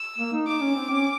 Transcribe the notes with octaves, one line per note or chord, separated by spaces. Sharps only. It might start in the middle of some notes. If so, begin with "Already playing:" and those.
Already playing: E6
A#3
D#4
D#4 D6
C#4
C4
C#4